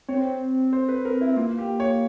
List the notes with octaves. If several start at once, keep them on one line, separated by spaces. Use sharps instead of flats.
C4 C#5
C5
C#5
C5
B4
A#4
E4
A#3 F4
G4
C#5